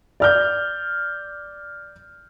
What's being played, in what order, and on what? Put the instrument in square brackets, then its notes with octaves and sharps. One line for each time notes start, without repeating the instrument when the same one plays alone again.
[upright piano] D5 F6 G6